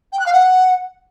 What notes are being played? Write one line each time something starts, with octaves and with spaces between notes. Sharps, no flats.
G5
F#6
F5
F#5